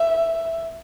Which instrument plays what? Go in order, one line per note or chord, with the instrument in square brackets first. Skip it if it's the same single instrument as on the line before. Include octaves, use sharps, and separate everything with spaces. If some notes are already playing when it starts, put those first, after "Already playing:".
Already playing: [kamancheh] E5